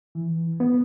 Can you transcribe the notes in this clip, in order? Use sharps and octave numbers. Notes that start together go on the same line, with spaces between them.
E3
B3